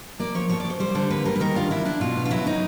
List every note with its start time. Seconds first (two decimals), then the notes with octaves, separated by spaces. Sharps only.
0.19 A#3 D5
0.34 F3 C#5
0.50 F3 C#5
0.60 D5
0.65 F3 C5
0.80 G3 C5
0.95 D3 C5
1.10 A#3 B4
1.25 G3 A#4
1.36 B4
1.40 D#3 A#4
1.55 D4 F4
1.70 D4 E4
1.85 D4 E4
2.01 B2 F4
2.16 B3
2.25 F4
2.30 F#3 E4
2.46 F#3 D#4